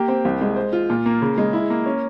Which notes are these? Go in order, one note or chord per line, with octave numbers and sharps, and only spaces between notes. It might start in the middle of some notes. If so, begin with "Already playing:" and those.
Already playing: A#3 G4
C4
C2
G#3
C5
F4
A#2
A#3
C#3
G#3
E4
A#3
C#4